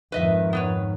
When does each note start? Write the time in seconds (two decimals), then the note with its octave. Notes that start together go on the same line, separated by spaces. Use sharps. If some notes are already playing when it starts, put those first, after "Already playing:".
0.12 F2 G#2 D#3 B4 D#5 E5
0.53 B3 B4 C#5